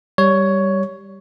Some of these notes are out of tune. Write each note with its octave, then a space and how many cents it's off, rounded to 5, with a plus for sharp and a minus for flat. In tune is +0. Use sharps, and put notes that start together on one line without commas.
G3 +0 C#5 +10